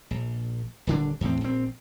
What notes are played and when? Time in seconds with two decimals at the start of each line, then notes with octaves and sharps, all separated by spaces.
0.11 A#1
0.87 D#1 D3 D4
1.21 E2 A2 C4
1.41 A#1 C4